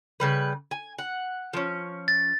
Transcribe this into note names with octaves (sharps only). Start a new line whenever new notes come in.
C#3 G3 B4
G#5
F#5
F3 C#4
A6